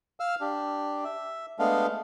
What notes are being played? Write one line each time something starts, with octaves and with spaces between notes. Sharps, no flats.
F5 E6 F6
D4 G4
E5
G#3 A3 B3 D4 F5